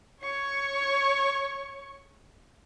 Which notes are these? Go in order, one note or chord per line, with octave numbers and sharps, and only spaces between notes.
C#5 C#6